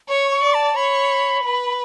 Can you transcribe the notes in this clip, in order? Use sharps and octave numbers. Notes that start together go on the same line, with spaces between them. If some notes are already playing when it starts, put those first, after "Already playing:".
C#5 C#6
C#6
D5
A5
C#5 B5
B4